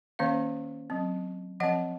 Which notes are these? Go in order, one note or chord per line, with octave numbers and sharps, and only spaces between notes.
D#3 A#3 C#4 C#5 F5
F#3 C4
F3 C4 D#5 F#5